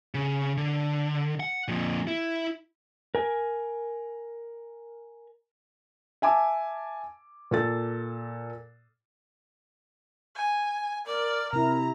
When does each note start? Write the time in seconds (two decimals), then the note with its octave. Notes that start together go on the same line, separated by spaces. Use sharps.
0.14 C#3
0.57 D3
1.40 F#5
1.68 F2 A#2
2.07 E4
3.15 A#4 G#5
6.22 E5 G#5 A5 D6
7.51 A#2 A4 A6
10.35 G#5
11.07 A#4 D5
11.53 C3 E4 A#5